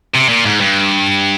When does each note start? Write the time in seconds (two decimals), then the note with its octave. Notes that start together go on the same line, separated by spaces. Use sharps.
0.15 C3
0.29 A#2
0.46 G#2
0.60 G2